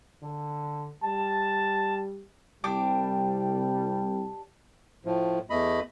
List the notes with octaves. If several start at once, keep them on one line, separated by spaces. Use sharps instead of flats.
D3
G3 A5
C2 G3 D4 G4 D6
A2 F3
E2 A3 D#5 B5